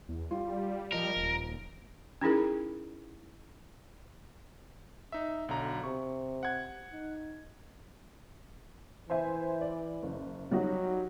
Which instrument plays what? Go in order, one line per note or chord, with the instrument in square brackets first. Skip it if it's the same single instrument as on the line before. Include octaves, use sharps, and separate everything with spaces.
[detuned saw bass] E2
[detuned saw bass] G3 [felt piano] F4
[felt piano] F3 D#5 [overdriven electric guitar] A#4
[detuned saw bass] D#1
[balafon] C#4 D#4 E4 G#4 A#4
[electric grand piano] D#4 E5
[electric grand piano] B1 D3 A#5 [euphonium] F#3
[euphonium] C3 [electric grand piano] C#6
[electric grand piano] F#5 G#6
[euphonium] D#4
[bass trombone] E3 [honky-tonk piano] C5 E5 G#5
[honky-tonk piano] D5
F#1
[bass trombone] F#3 [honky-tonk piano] G3 D#4 F#4